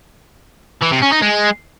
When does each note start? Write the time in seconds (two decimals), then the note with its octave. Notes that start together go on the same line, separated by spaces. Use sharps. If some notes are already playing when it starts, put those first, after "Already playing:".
0.82 E3
0.92 C3
1.02 C#4
1.12 D#4
1.22 G#3